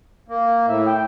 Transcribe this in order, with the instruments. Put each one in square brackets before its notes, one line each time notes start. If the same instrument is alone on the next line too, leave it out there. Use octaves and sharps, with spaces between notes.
[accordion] A#3
[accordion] A2 [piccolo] E5
[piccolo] G5